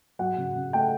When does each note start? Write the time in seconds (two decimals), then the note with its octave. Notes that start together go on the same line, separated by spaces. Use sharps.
0.19 F#3 F#5
0.37 C#3
0.55 C#3
0.73 A3 G5